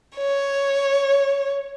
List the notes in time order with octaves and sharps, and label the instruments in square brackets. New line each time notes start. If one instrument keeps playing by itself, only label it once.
[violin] C#5